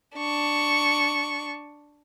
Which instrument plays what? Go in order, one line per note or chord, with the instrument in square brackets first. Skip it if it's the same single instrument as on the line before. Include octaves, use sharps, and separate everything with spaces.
[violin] D4 C#6